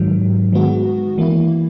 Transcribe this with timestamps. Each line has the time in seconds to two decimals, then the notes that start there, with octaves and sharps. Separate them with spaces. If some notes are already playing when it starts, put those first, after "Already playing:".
Already playing: G#2 D#3 F#3
0.53 D#3 G#3 B3 F#4
1.18 E3 A#3 E4